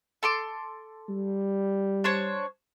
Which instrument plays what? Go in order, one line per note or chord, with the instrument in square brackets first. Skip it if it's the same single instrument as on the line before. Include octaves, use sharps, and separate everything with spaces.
[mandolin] A4 C6 D6
[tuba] G3
[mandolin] D4 C5 C#5